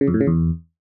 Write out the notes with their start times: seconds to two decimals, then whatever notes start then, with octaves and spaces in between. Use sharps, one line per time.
0.01 C#3
0.08 F2
0.14 A2
0.21 C#3
0.27 E2